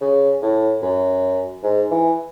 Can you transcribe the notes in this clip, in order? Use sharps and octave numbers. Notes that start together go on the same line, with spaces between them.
C#3
A2
F#2
G#2
E3